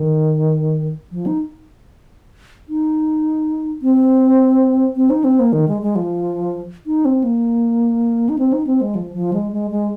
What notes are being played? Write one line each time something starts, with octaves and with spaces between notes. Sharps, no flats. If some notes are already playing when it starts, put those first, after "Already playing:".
Already playing: D#3
F3
D#4
D#4
C4
C4
D#4
C4
A#3
D#3
G#3
G#3
F3
D#4
C4
A#3
D#4
C4
D#4
C4
G#3
F3
F3
G#3
G#3
G#3